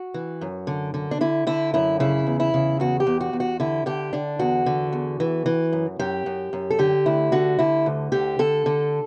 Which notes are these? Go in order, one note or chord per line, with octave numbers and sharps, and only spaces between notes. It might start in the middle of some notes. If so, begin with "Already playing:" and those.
Already playing: F#4
E3
F#2
D3
D3
D4
D3 E4
D3 E4
F#2 E4
C#3 E4
E2
E4
C#3
E2 F#4
G4
E2
F#4
E2
F#4
D3 E4
D3 G4
D3 D4
E2 F#4
D3
E2
E3
E3
F#2
F#2 G4
F#2
F#2
A4
D3 G4
D2 E4
D3 F#4
D3 E4
D2
D3 G4
D3 A4
D3